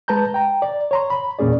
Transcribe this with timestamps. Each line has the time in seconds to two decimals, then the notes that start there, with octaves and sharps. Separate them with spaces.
0.08 G#3 B4 A5 A#5 G6
0.34 G5 A#5
0.62 D5
0.91 C#5 A#5 C6
1.10 B5
1.39 E2 A#2 A#3 C#4 G#4 D5